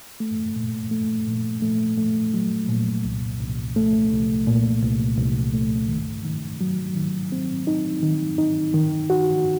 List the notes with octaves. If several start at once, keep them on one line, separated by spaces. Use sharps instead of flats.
A3
A#2
A3
A#2
A3
A3
F#3
A#2
C2
C2
A3
C2
A#2
C2
C2
A3
D#3
D#3
F#3
D#3
C4
D#4
D#3
D#4
D#3
F#4